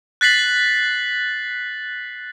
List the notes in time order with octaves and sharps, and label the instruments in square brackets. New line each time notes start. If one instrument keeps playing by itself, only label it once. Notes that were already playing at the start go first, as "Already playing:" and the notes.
[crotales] F#6 A6 B6 C7 F#7